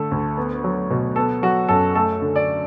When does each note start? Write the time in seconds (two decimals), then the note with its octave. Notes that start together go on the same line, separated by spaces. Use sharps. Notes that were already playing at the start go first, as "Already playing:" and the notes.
Already playing: D3 A3 A4
0.11 D2
0.37 B3
0.64 F#3
0.90 B2
1.16 B3 A4
1.42 F#3 F#4
1.69 F#2 A4
1.95 A3 A4
2.22 D3
2.36 D5